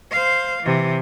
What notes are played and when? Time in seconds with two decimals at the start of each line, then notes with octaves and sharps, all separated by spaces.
0.11 C5 F5
0.63 C3 E3